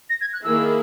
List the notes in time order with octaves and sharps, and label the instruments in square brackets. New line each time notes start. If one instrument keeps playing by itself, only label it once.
[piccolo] A#6
G#6
F#6
[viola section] D#3 A#3 E4 G#4 [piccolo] E6